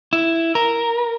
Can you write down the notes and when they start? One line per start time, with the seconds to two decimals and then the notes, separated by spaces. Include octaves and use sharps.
0.13 E4
0.55 A#4